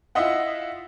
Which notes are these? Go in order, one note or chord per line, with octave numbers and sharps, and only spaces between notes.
E4 F4 D#5 E5 F#5